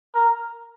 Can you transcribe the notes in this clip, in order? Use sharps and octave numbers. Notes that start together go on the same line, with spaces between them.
A#4